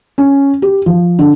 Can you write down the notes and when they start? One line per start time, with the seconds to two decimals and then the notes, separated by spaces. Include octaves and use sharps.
0.18 C#4
0.62 G4
0.86 F3
1.19 D3